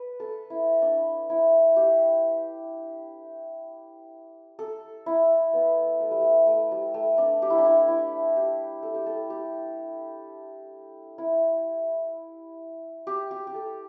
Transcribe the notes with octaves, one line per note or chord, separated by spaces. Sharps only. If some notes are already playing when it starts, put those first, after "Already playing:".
Already playing: B4
A4
E4
D4
E4
G4
A4
E4
B3
A3
G3
A3
A3
G3
A3
D4
G4
E4
D4
E4
E4
G4
A4
G4
A4
G4
E4
G4
G4
G4
A4